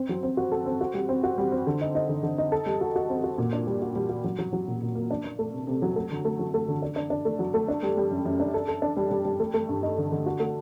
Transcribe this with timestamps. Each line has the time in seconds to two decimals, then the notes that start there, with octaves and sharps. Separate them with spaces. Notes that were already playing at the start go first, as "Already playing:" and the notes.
Already playing: C4
0.09 F#3
0.23 C4
0.37 F#4
0.52 A4
0.66 C4
0.81 F#4
0.94 G3
1.09 C4
1.23 F#4
1.38 G3
1.52 C4
1.67 D3
1.81 D#4
1.95 D#4
2.09 D3
2.23 D3
2.38 D#4
2.52 A4
2.66 G3
2.81 F#4
2.96 F#4
3.09 C4
3.24 F#4
3.38 A#2
3.53 D4
3.67 G3
3.82 F#4
3.95 G3
4.09 F#4
4.24 F#3
4.39 F#3
4.53 F#3
4.68 A#2
4.81 A#2
4.95 A#3
5.10 D4
5.24 D4
5.39 A3
5.52 C3
5.67 C3
5.82 F#3
5.96 A3
6.11 D3
6.25 A3
6.39 F#3
6.54 A3
6.68 D3
6.82 D4
6.96 D4
7.10 D4
7.25 A3
7.39 F#3
7.54 A3
7.68 D4
7.83 G3
7.97 G3
8.11 F#2
8.25 F#2
8.40 D4
8.54 A4
8.68 A4
8.82 D4
8.96 G3
9.11 G3
9.25 G3
9.40 A3
9.54 A3
9.69 G2
9.83 D#4
9.98 D3
10.12 D3
10.26 F#4
10.40 A3